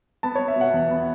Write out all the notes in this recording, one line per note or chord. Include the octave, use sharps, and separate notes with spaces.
B3 A5
B3 C#5
E5
B2
F#5
E2
B3